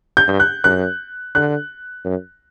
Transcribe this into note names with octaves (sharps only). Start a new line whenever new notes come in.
G6
G2
F#6
F#2 F#6
D3 F#6
F#2